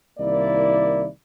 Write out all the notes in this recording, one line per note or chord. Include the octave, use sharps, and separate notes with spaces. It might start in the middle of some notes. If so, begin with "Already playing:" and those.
C2 D#3 A#3 E4 D5